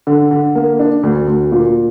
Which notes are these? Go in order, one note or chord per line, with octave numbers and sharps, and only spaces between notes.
D3
D3
A#3
D4
D2
D2
A#2